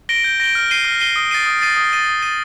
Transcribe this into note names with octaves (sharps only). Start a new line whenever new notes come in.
A#6 D7 G7
G6
A#6 D7 G7
F6
C7 D#7 G7
F6
C7 D#7 G7
D#6
A6 C7 D#7
D#6
A6 C7 D#7
D#6
A6 D#7
D#6
A6 D#7